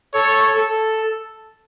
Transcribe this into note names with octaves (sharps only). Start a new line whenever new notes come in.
A4 C#5
A4